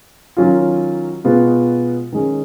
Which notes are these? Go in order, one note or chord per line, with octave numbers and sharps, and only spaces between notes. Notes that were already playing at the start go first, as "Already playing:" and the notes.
D#3 F#3 C#4 F4
B2 G#3 B3 F4
D#3 G#3 C#4